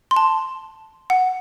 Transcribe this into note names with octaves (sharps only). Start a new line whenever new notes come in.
C6
A5
F#5